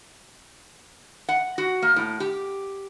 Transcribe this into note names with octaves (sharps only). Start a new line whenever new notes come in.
F#5
F#4
A#3
A2
G4